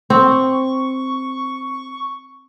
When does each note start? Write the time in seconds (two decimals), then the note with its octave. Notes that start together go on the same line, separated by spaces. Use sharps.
0.10 C4 C#6